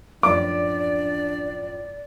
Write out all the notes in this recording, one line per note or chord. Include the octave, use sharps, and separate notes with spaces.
F#2 A2 F3 D4 D5 D6